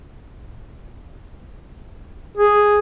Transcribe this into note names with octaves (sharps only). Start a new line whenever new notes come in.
G#4